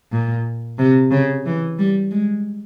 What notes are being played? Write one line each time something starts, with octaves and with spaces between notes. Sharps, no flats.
A#2
C3
C#3
E3
G3
G#3